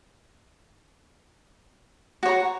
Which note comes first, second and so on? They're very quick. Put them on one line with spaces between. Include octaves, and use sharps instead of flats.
F#4 C#5 A#5